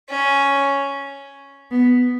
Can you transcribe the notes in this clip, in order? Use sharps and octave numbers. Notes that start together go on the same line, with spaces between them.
C#4
B3